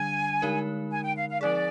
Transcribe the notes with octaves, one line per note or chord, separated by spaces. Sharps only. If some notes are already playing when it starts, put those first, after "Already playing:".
Already playing: D3 G3 D4 G#5
D3 G#3 D#4 A#4
G#5
G5
F5
F5
F3 C4 D#4 G#4 D5